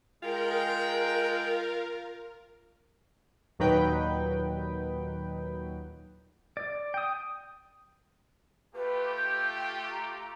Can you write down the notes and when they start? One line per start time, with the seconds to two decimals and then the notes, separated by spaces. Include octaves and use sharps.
0.23 G#3 F4 A#4 G5
3.59 D#2 A#2 F#3 D#4 B4 G5
6.57 D5
6.94 G5 D#6
8.74 A3 F4 G4 B4
9.16 G6
9.56 G5
9.90 A#5